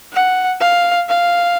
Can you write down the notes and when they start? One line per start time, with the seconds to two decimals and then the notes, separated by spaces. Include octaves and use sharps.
0.13 F#5
0.60 F5
1.09 F5